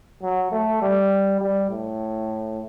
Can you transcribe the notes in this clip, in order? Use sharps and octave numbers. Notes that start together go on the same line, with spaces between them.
F#3
A3
G3
G3
A2